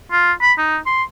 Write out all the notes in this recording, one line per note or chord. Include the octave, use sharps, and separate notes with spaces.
F4
B5
D#4
C6